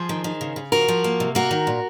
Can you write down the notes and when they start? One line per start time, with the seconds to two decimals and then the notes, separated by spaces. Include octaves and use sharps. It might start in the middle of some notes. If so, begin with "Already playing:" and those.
Already playing: F3 G#4 C5
0.09 D#3
0.24 D#3
0.41 C#3
0.56 C#3
0.72 F3 F#4 A#4
0.88 F3
1.04 A#3
1.20 C3
1.35 A#3 F#4 A#4
1.51 D#3
1.67 A#2